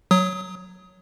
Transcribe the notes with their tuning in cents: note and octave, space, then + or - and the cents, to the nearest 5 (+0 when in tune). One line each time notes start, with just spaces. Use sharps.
F#3 +0 D#6 +25